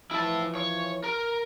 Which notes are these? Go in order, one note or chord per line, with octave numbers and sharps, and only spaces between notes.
E3 F3 E4 A5
C#5
A#4